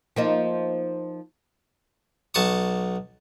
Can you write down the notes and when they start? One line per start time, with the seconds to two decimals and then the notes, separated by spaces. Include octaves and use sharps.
0.16 F3 A#3 D#4
2.34 B1 A5 C#6 D#6